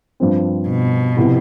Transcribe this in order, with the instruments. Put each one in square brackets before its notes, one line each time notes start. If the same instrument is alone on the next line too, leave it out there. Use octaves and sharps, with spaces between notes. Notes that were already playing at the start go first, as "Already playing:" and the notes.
[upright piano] G2 F3 C4
[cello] B2
[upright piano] C3 F3 B3 E4